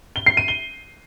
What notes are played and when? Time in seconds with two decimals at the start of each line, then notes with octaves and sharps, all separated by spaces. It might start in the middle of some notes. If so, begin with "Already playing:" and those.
0.16 G7
0.26 C7
0.37 D#7
0.48 G7